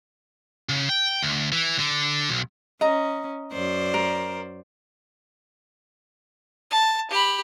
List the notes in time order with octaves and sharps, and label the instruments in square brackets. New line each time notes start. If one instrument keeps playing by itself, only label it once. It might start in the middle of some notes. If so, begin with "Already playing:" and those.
[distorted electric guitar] C#3
G5
D2
E3
D3
B1
[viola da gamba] C#4 [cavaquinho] D#5 A#5
[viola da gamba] F#2 C5 D5
[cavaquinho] A#4
[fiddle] A5
G4 B5